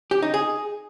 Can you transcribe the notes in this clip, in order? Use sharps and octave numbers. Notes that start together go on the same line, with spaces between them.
G4
D#4
G#4